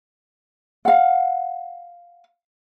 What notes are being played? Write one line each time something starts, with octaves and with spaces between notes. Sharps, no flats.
F5 F#5